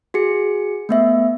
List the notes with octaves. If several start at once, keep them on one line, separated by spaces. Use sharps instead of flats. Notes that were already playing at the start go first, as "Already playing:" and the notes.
F#4 G#4 C#7
A3 B3 E5